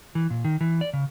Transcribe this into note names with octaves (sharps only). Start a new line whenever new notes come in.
E3
A#2
D#3
E3
D5
C#3